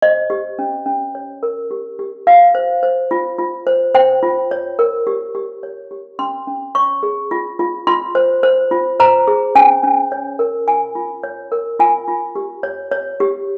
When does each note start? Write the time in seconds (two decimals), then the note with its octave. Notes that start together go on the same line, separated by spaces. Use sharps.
0.02 C5 D#5
0.30 G4
0.59 C#4
0.86 C#4
1.15 C#5
1.43 A#4
1.71 G4
1.99 G4
2.27 F4 F5
2.55 C5
2.83 C5
3.11 F4
3.38 F4
3.67 C5
3.95 C5 G5
4.23 F4
4.51 C#5
4.79 A#4
5.07 G4
5.35 G4
5.63 C#5
5.91 G4
6.19 C#4 C6
6.47 C#4
6.75 C#5 C#6
7.03 G#4
7.31 F4
7.59 F4
7.87 F4 C6
8.15 C5
8.43 C5
8.71 F4
9.00 C5 A#5
9.27 G#4
9.55 C#4 G#5
9.83 C#4
10.12 C#5
10.39 A#4
10.67 F4 G#5
10.95 F4
11.23 C#5
11.52 A#4
11.80 F4 G#5
12.08 F4
12.35 G4
12.63 C#5
12.92 C#5
13.20 G4